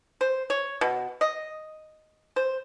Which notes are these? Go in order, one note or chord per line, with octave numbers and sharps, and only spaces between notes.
C5
C#5
B2
D#5
C5